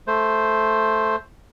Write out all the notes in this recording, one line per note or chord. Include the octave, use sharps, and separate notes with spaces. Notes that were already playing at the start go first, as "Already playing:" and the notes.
A3 C5